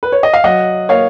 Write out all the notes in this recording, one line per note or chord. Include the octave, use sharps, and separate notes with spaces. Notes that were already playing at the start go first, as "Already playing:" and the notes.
B4
C#5
D#5
F5
F#3 D#5 F#5
A#3 C#5 F5